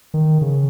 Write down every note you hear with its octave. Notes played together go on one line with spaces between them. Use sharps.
D#3
C#3